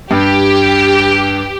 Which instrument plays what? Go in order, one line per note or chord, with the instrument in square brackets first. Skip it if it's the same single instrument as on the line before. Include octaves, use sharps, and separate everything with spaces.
[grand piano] G2 [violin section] G4